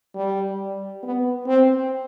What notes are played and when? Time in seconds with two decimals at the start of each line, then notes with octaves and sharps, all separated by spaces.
0.15 G3
1.03 B3
1.47 C4